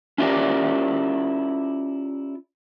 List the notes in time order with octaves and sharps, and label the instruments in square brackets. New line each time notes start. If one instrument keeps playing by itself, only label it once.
[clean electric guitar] C#4 E4 F4 G4 A#4 D5